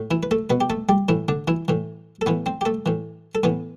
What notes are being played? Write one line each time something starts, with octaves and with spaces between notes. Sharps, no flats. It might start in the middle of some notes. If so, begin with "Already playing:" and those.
Already playing: A2
E3 E4
B4
A3 A4
B2 B3 B4
G4
A3 A4
G3 G4
A2 E3 E4
D3 D4
E3 E4
A2 E3
A4
A2 E3 B3 B4
C4 C5
G4
A3 A4
A2 E3
A4
A2 E3 B3 B4